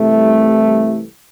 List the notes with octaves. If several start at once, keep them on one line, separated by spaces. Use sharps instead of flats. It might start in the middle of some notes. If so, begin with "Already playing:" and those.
Already playing: C2 C3 E3 G3 A3